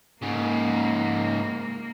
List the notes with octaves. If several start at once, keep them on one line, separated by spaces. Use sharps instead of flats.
G#2 C#3 A#3